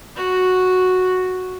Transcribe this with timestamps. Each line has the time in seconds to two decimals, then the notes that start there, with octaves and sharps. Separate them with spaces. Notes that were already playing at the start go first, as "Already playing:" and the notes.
0.16 F#4